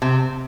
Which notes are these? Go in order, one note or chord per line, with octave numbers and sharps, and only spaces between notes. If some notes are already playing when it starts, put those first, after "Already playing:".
C3